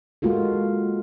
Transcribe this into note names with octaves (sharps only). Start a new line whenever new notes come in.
G#3 A#3 F4 F#4 A4